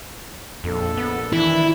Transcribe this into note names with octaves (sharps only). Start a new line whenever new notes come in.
A#1 F2 A4
B3
D#3 E3 D4 E4